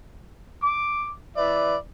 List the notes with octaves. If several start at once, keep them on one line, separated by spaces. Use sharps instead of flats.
D6
E3 B4 D5 E5